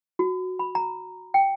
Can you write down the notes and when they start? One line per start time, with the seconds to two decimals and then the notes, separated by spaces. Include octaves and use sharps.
0.19 F#4
0.59 B5
0.75 A#5
1.34 G5